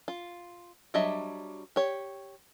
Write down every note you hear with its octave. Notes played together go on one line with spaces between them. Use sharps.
F4
F#3 G3 D4 D#5 E5
G4 C#5